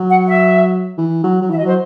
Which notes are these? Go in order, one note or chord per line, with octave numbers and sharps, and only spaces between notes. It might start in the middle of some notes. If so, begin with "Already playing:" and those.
Already playing: F#3
F#5
E5
E3
F#3
F#3
E3 E5
D#5
F#3 C5